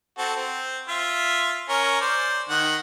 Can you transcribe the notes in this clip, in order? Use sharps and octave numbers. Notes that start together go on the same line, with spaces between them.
C4 F#4 A4
C4
F4 E5
C#4 A#4 C#5
C5 D5
D#3 F#5